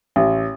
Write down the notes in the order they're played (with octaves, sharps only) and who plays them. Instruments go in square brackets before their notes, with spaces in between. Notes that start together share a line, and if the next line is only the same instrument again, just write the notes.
[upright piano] A1